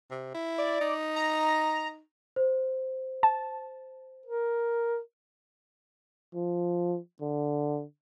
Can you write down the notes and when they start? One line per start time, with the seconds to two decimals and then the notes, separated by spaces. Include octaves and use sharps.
0.11 C3
0.35 E4
0.58 D5
0.81 D#4
1.16 A#5
2.36 C5
3.23 A5
4.26 A#4
6.35 F3
7.21 D3